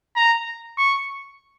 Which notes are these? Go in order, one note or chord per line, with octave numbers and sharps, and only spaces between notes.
A#5
C#6